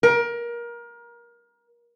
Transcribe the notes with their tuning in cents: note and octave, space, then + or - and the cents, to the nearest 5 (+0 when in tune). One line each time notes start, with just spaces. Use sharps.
A#4 +25